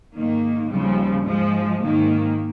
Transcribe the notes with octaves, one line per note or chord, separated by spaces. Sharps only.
G#2 D#3 A#3
D#2 C#3 F3 G3
G#2 F3 G#3
G#2 D#3 A#3